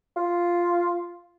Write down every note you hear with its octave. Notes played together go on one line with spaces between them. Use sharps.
F4